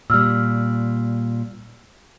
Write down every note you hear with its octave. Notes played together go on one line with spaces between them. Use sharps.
A#2 G3 E6 F6